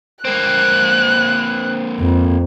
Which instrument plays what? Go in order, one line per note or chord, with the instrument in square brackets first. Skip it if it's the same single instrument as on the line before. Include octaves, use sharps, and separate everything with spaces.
[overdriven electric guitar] A#3 C4 [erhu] F#6
[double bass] F2